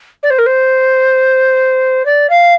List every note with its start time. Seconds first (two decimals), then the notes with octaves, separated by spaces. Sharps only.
0.23 D5
0.30 C5
0.38 A#4
0.46 C5
2.05 D5
2.29 F5